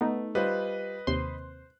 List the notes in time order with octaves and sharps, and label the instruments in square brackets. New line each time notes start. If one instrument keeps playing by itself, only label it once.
[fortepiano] A3 [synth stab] B3 D#4
[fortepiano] G3 F4 C5 [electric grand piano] B4 D#5 F#6
[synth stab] D#2 C3 C6 [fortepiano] C5